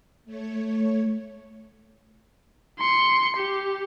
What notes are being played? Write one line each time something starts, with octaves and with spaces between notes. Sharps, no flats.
A3 C#5
C6 C#7
G4